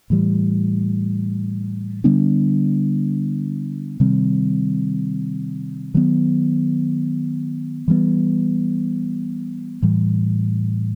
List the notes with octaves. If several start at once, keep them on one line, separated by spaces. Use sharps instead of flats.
A2 E3 G3
D3 G3 B3 D4
C3 D#3 G3 C4
D#3 F#3 B3
E3 G3 B3
A2 E3 G3